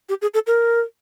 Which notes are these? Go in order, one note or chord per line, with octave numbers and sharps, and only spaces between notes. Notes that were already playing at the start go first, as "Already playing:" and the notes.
G4
G#4
A4
A#4